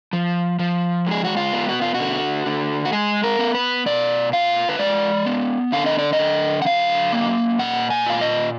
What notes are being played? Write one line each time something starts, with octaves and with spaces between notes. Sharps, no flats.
F3
F3
G#3 G#4
F#4
F4
B3
F#4
F4
F#4
D3
D3
F#4
G#3 G#4
A#4
B3
B4
B2 D5
F4 F5
B4
G#3 D5
B3
D3 F5
D#5
D5
D#5
D3
F#5
F#3 F5
A#3
A#2 F#5
G#5
F4 F5
D#5